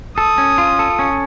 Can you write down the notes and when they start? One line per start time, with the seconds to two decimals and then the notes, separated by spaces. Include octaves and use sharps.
0.18 A4 D#6
0.38 C#4
0.58 F4
0.79 A4
0.99 C#4